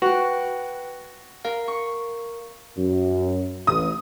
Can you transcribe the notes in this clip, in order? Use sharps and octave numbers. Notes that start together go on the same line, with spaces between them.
F#4 B4 G5
A#4 F5
C#6
F#2
A1 D#6